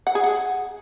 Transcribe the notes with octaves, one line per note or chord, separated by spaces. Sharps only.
F#5
G#4
F#5